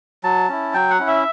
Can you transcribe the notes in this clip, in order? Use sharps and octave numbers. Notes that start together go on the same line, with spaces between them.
F#3 A5
C#4 E4
F#3 G5
F#5
C#4 E4
E5